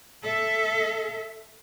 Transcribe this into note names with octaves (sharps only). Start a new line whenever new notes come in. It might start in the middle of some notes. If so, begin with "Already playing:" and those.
A4 E5